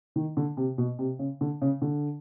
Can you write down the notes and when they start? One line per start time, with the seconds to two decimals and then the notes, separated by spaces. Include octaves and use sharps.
0.16 D#3
0.37 D3
0.57 C3
0.78 B2
0.99 C3
1.19 C#3
1.41 D3
1.62 C#3
1.82 D3